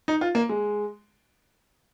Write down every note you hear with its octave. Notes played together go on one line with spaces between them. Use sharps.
D#4
F4
A#3
G#3